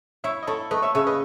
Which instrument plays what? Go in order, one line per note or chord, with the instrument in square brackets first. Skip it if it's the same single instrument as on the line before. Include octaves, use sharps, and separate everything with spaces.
[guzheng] E4 [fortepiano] C#5 E5
[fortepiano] D#5
[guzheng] E4 [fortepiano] A4 C#5
[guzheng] A3 [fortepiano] B4 D#5
[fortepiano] C#5 E5
[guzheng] C#3 [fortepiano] C#5 E5
[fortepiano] B4 D#5